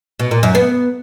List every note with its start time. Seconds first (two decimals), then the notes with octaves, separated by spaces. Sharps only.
0.19 B2
0.31 A#2
0.43 F#2
0.55 B3